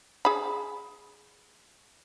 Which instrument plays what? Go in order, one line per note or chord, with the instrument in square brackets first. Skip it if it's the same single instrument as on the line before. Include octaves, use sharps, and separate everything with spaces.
[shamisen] G#4 B5